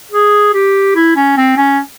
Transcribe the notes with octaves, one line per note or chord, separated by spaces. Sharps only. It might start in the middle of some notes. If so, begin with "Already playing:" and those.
G#4
G4
E4
C#4
C4
C#4